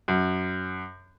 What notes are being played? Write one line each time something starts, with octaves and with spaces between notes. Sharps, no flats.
F#2